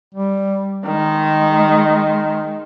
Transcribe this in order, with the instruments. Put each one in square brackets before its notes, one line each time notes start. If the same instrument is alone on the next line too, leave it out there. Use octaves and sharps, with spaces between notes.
[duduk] G3
[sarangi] D#3 [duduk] G#3